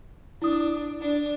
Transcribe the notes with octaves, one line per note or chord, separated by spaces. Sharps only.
D4 E4 D#6
D4